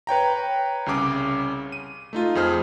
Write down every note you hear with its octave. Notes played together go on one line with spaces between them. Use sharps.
B4 C#5 G5 A#5
C2 C#3 C#4 D6
D#7
A3 D#4 F4
F2 G#4 C5 F6